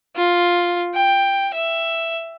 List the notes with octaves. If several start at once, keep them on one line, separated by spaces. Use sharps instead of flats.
F4
G5
E5